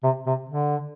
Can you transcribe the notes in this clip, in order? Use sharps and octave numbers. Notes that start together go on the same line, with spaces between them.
C3
C3
D3